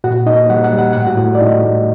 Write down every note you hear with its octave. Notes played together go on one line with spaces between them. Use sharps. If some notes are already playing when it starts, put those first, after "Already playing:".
A#2 F#4 F#5
A#3 D#4 D#5
G3 F#5
F#5
G3
F#5
A2 F#5
F#4 F#5
A2
D5
A2 D#4 D#5
A3